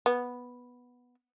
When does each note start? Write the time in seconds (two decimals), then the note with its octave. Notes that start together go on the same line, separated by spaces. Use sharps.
0.06 B3